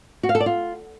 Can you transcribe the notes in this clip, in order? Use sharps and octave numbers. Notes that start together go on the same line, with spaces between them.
F#4
F5
A4
D5
F4